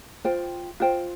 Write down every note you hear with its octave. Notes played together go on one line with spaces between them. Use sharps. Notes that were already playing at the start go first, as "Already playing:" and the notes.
F4 C5 G5
F4 C5 G5